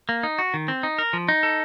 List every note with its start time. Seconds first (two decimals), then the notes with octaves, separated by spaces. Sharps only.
0.09 A#3
0.23 D#4
0.39 F#4
0.54 D#3
0.68 C4
0.83 D#4
0.99 A#4
1.13 F3
1.28 D#4
1.43 A4